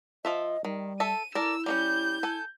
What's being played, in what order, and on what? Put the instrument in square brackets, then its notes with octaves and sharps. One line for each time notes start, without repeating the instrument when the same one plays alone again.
[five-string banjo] F3 F4 E5 [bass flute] D#5
[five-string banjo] D#3 [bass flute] G3
[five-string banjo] A4 E5 A5 [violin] D#7
[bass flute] E4 [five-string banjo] A4 A#4 D5 [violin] E6
[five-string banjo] G3 A#3 C#4 [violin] G6
[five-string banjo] A4 G#5